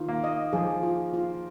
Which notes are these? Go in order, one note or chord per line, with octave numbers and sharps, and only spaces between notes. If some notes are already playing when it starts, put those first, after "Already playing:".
Already playing: D#3 F4
A#3
D#5
F3 G#4
F4
F4